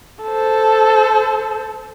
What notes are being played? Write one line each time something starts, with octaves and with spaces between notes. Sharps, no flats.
A4 C5